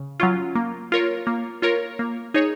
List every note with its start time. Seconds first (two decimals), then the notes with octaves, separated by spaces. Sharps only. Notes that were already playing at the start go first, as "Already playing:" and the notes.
Already playing: C#3
0.20 F#3 C#4 F4
0.55 A#3
0.92 F4 A#4 C#5
1.27 A#3
1.62 F4 A#4 C#5
1.99 A#3
2.34 D#4 G#4 C#5